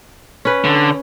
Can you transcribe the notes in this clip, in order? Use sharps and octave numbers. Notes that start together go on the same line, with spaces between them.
C#4 B4
D3